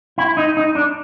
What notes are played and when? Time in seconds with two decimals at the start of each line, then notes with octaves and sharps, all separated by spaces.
0.18 E4
0.37 D#4
0.57 D#4
0.75 D4